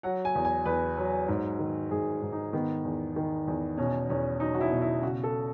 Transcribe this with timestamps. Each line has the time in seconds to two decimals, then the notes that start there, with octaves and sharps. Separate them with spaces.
0.03 F#3 F#5
0.25 G#5
0.35 E2
0.45 G#5
0.65 E2 B4
0.98 F#3
1.28 G#2
1.59 D#3
1.91 G#2 G#4
2.22 G#2
2.32 D#4
2.53 D#3 B3
2.84 E2
3.16 D#3
3.47 E2
3.77 B2 C#4
4.09 E2 C#4
4.40 F#3 D#4
4.54 F#4
4.61 E4
4.71 B2
4.81 E4
5.02 C#3 F#4
5.23 A4